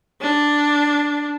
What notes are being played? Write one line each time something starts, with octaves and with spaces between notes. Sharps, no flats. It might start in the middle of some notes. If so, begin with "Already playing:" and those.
D4